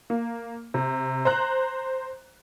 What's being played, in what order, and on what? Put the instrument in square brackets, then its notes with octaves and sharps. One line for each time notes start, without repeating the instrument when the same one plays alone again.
[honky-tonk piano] A#3
C3
C5 A#5 F#6